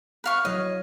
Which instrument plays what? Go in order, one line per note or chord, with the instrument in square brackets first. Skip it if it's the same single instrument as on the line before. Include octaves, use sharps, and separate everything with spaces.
[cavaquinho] B4 F5 C#6
[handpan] F#3 E4 C#5 [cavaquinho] D#5